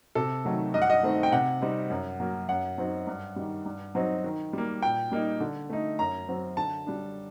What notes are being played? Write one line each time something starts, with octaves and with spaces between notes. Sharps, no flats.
C3 A4
D#3 F#3 A3
G2 D#5
F#5
D#5
D#3 A3 C4 D#4
G5
C3 F#5
G3 C4 D#4
F#2
F#3 A#3
F#2 F#5
F#3 C4 D#4
G2
D#3 G3
G2
F#3 C4 D#4
D#3
G3 A#3
A#2 G5
G3 A#3 D#4
D3
A3 D#4
F#2 A#5
F#3 C4
D3 A5
G3 D4